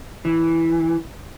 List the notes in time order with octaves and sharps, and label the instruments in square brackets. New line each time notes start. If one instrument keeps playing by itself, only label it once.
[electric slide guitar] E3